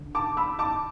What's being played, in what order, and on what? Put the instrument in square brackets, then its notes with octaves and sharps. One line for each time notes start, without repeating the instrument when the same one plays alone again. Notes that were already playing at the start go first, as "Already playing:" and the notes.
Already playing: [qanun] D3
[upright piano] A5 D6
B5 E6
A5 D6